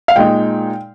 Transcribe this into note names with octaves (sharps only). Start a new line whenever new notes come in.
F5
A#2 G#3 D#4 G5